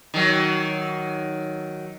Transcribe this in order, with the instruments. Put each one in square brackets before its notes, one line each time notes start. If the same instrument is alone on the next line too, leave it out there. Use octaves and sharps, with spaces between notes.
[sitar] D#3 F#3